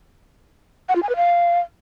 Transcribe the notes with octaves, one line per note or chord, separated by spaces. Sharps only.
F#5
F4
G#5
B4
F5